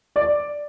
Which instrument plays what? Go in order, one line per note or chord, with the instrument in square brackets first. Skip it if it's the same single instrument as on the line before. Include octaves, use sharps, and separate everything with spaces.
[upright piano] D5